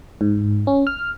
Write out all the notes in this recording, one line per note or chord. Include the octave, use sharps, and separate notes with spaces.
G#2
C#4
F6